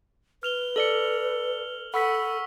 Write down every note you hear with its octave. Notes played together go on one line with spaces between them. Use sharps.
B4 F6 F7 G7
A4 D5 C#7 F#7 G7
A4 F#5 B5 C#6 E6 B6